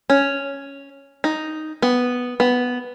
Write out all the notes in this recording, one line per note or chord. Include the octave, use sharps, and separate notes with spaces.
C#4
D#4
B3
B3